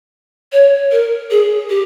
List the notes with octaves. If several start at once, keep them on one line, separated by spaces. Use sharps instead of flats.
C#5
A#4
G#4
G4